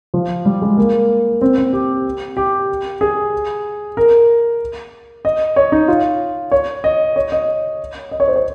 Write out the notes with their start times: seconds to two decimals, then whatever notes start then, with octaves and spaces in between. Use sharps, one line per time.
0.14 F3
0.45 G3
0.62 G#3
0.77 A#3
1.41 C4
1.58 C4
1.73 G4
2.37 G4
3.01 G#4
3.97 A#4
5.25 D#5
5.56 C#5
5.72 D#4
5.88 F4
6.52 C#5
6.84 D#5
7.16 C#5
7.32 D#5
8.11 D#5
8.20 C#5
8.28 C5
8.36 C#5